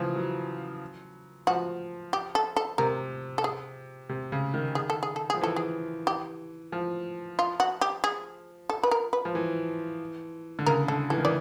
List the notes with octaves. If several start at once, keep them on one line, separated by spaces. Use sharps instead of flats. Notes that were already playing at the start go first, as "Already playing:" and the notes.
Already playing: C#3 E3 F3
F#3
F3 F#4
G4
A4
A4
C3 A#4
A4
G#4
C3
C#3
D#3
G#4
A4
G#4
A4
F3 G#4
E3 A4
G#4
G4
F3
F4
F#4
G4
G#4
A4
B4
A#4
B4
F3
E3
D3
C#3 A#4
D3 A4
E3 A4
D#3
E3 D5